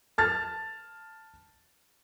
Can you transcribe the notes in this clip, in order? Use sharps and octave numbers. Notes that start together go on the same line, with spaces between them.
A5 F6 A6